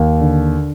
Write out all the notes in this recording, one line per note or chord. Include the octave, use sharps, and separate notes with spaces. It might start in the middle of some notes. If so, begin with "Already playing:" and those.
Already playing: D#2
D3